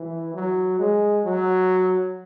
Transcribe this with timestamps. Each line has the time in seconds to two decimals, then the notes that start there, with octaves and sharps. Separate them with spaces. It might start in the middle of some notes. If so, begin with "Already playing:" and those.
Already playing: E3
0.34 F#3
0.79 G#3
1.25 F#3